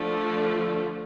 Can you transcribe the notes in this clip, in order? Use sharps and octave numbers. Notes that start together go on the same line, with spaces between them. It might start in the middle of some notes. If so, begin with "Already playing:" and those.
Already playing: D3 F3 A3